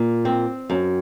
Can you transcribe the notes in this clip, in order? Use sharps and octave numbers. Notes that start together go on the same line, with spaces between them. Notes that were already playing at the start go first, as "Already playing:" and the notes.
Already playing: A#2
C4
F#2